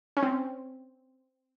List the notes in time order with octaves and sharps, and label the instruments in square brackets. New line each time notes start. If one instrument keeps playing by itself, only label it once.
[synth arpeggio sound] C#4
C4